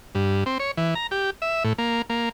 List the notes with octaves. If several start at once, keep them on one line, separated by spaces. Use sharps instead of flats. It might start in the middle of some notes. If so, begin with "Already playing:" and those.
G2
C4
C#5
E3
A#5
G4
E5
A2
A#3
A#3